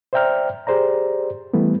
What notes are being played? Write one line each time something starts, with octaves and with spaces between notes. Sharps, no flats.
C5 D5 E5 G5 A#5 F6
G4 G#4 C5 D5 A#5
E3 G3 A3 B3